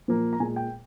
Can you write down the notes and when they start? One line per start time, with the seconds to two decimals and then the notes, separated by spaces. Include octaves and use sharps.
0.08 A#2 F3 A#3
0.33 A#5
0.40 A#2 G#3 G#5
0.56 G5